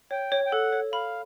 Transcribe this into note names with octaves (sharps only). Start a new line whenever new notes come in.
C#5 G5
C#5
G5
A4 F#5
C#5
F5 B5